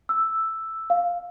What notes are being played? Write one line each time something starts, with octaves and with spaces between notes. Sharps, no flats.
E6
F5